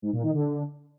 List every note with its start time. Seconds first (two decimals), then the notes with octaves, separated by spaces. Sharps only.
0.02 G#2
0.13 A#2
0.23 D#3
0.34 D3